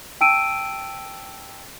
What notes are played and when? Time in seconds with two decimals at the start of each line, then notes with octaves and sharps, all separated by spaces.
0.21 G5 A5 E6 D7 D#7